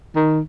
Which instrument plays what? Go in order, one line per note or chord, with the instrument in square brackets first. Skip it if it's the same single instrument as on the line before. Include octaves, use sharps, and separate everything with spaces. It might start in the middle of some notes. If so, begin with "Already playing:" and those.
[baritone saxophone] D#3